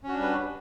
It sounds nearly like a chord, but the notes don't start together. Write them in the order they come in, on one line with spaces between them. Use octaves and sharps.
C#4 F#4 D4 G3 B4